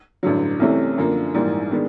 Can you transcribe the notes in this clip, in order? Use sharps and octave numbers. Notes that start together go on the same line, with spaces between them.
A1 G2 D3 F#3
C2 C3 E3 A3 C#4
F#2 D3 F3 A#3
A#1 G#2 E3 G3 A#3
D#3 G#3 B3 D4